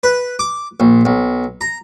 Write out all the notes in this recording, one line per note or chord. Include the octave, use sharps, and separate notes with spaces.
B4
D6
A#1
B1
A#5